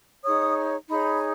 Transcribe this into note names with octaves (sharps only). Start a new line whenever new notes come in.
D#4 G#4 C#5 D#6
D#4 G#4 C#5 B5